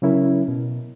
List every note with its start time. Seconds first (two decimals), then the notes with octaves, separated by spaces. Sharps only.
0.02 C#3 F#3 C#4 E4 A#4
0.48 B2